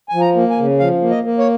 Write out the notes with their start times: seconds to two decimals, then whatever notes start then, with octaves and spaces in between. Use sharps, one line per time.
0.09 F3 G#5
0.21 A#5
0.36 A#3
0.50 G#5
0.58 C#3
0.80 F3 F5
1.02 A#3
1.10 D#5
1.24 A#3
1.39 C#5